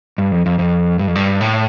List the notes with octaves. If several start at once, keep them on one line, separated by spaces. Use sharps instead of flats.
G2
F2
F2
F2
G2
F2
G2
A2